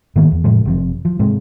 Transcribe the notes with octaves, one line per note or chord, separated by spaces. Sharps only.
G#2 D#3 A#3 B3
E2
A2 C#3 F3 G#3
F#1 C3 F3
F3
G#2 C3 G#3